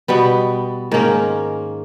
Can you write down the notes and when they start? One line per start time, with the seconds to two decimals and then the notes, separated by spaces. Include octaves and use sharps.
0.08 B2 G3 B3
0.91 G#2 D#3 A#3 C#4